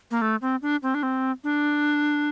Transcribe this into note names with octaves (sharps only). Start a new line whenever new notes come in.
A#3
A3
C4
D4
C4
D4
C4
D4